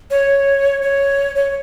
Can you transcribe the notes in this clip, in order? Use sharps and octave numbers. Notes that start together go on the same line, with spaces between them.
C#5
C#5
C#5